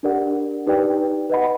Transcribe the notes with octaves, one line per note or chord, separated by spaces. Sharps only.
D4 G4 A#4 D5 F#5
D#4 G4 B4 D5 G5
B4 D#5 F#5 B5